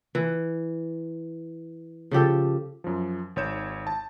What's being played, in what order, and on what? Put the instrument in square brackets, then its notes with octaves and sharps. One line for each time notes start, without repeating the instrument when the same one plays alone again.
[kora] E3
C#3 F3 G4 A4
[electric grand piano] F#2 F3
G#1 C#5 G6 E7
A5